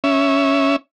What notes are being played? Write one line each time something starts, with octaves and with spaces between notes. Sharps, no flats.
C#4 E5